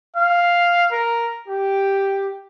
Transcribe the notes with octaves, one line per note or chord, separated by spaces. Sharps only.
F5
A#4
G4